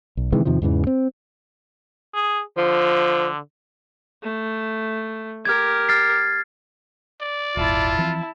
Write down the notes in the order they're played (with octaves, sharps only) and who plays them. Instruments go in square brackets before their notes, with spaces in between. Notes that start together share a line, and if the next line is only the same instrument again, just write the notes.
[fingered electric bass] B1
C3 D#3 E3 G#3
E2 C3 D#3 F3
E2 G#2 C#3 E3
C4
[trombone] G#4
[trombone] D3 [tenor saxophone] F3
[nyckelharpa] A3
[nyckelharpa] G4 A#4 [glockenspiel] F6 G#6
[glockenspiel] F6 A6 C7
[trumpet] D5
[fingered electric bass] D#1 G#1 [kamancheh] E4 A5 [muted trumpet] F4
[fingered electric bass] E3 F3 C4